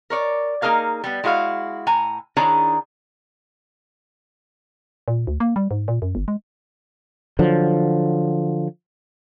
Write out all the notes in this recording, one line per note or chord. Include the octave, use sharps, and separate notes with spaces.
A#4 C#5 D5
A#3 D#4 G#4 A#4 F5
G3 B3
G#3 E4 F#4 A#4 F5
A2 G#5 A#5
D#3 D4 E4 G#4 C#5 A#5
A#2
D2
A#3
G3
G#2
A#2
F#2
G1
G#3
D3 F3 F#3